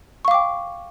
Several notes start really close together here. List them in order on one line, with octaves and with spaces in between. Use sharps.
C#6 F5 D6 G5